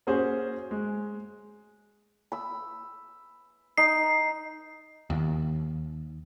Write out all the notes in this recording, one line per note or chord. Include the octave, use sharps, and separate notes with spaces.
A#3 C#4 F#4 G#4 C5
G#3
B5 E6
D#4 C7
D#2